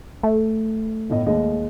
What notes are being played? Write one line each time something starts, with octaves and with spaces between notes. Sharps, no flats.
A3
G1 A2 D#5
D#2 G#3 D#5